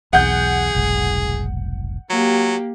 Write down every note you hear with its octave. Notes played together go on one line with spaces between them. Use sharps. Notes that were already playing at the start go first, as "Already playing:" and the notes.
B1 E2 G#4 F#5 G6
F1 B1 G#2
F#3 A#3 G4